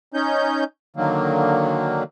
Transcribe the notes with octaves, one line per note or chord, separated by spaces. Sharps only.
C#4 D#4 G6
D3 D#3 F#3 A#3